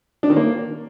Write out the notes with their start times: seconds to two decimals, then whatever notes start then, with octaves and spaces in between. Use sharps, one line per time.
0.23 D4
0.30 D#3
0.36 A#3